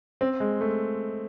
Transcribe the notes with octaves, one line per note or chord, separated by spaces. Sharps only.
C4
G#3
A3